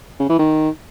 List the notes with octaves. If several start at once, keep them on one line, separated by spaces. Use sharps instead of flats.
C#3
E3
D#3